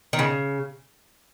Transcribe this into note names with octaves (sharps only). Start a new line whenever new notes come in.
D#3
C#3